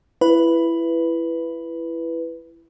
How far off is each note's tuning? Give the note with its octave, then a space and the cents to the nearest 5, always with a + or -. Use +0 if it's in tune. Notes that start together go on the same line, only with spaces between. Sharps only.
E4 +20 B4 +0